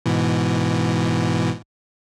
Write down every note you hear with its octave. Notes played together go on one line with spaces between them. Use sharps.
G#2 B2 E3